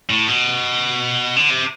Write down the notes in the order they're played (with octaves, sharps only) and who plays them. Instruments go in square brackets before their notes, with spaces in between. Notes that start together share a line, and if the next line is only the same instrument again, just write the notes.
[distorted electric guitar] A2
B2
D3
C3